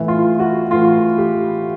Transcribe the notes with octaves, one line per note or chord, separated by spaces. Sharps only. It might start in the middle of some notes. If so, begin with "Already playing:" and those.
Already playing: A2 E3 E4
F4
F#4
A2 E3 F4
G4